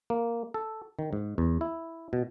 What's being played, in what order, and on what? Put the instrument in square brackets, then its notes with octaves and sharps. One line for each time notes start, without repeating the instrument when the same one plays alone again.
[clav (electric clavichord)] A#3
A4
D#3
G#2
E2
E4
B2